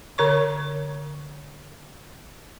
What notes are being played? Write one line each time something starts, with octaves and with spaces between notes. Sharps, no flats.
D3 C#5 C#6